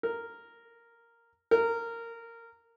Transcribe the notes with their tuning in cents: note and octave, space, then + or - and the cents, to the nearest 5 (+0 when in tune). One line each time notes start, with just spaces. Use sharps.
A#4 -5
A#4 -15